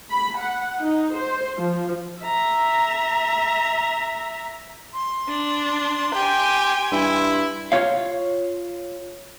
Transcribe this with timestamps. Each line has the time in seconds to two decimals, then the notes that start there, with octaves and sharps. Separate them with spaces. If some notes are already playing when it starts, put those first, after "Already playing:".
0.11 B5
0.39 F#5
0.80 D#4
1.15 C5
1.58 F3
2.23 E5 A#5
4.93 C6
5.29 D4
6.15 G4 G5 G#5
6.92 G2 E4
7.72 F4 C#5 F5